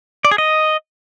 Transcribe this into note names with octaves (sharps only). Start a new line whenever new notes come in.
D5
G#4
D#5